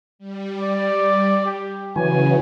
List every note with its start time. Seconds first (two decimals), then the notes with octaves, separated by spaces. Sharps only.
0.19 G3
0.62 D5
1.46 G4
1.96 C#3 E3 F#3 G#5